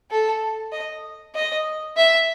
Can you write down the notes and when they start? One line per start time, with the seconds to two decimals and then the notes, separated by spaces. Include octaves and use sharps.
0.11 A4
0.72 D#5
1.35 D#5
1.97 E5